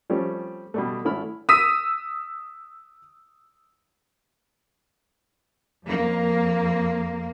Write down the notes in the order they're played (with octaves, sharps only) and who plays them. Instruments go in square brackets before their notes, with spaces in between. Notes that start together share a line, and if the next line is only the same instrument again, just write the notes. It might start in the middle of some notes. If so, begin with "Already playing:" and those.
[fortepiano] F3 G3 A3 C4 C#4 G4
B2 G3 A3
G#1 A3 E4 B5 F6
[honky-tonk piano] D#6 E6 B6 D#7
[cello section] F2 A#3